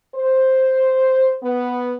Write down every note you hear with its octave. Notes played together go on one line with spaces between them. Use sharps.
C5
B3